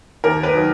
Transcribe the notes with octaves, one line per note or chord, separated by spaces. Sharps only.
D#2 A#4
B4
D#3 F#3